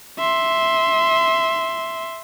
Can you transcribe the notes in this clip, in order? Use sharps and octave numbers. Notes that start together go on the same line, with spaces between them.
E5 C6